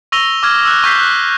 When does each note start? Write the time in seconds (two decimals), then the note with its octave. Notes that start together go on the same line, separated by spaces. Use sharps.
0.12 C#6 E6 A#6 D#7 F7 G7
0.43 D6 F6 G#6
0.65 E6 F#6
0.84 C#6 G6 B6 C7
1.00 F#6